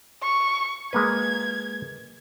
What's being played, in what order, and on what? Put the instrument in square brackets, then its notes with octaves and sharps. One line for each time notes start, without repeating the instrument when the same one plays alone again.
[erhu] C#6
[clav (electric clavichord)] G#3 A#3 B4 [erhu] G#6